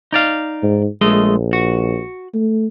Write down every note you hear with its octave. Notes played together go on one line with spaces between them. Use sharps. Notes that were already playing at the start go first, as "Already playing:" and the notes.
D#4 D5 F5
G#2
A#1 G#3 A3 D#5
F#4
A3